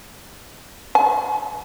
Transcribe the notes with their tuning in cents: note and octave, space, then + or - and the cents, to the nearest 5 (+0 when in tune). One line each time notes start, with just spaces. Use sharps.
G#5 +30